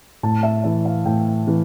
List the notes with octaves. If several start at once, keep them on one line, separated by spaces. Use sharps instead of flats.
A2 A5
E5
E3 E5
F5
A2 G5
E3